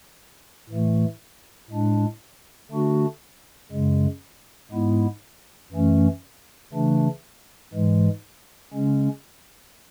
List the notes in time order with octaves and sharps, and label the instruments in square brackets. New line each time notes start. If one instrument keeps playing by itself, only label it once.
[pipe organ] A2 E3 A3
A2 G#3 D4
D3 A3 D4 F#4
F#2 C#3 G#3
G#2 G#3 B3 E4
F#2 E3 A3 C#4
C#3 E3 A3 D4
G#2 E3 G#3
C#3 G#3 C#4